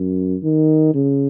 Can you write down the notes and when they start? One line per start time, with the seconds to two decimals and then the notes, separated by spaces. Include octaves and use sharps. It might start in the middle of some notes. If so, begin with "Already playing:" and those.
Already playing: F#2
0.43 D#3
0.94 C#3